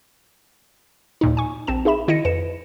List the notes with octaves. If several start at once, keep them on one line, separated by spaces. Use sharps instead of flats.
D#2 A#2 D#4
G#5 C#6
A#1 C4 A5 E7
D#4 G#4 E5 B5 E7
D#3 E4 D#5 A#6 C#7 D#7
F2 B4 C#7 E7